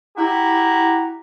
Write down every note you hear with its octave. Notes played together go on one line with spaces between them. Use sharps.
E4 F#4 G4 A#5